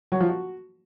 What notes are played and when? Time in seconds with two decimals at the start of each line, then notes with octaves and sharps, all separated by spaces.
0.12 F#3
0.20 F3
0.29 F#4